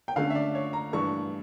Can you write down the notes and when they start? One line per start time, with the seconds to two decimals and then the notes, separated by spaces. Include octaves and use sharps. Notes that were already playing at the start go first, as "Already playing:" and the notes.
0.08 G5
0.16 D3 A3 C#4 F5
0.30 E5
0.35 D5
0.55 C#5
0.73 A#5
0.93 G2 E3 A3 D4 C#6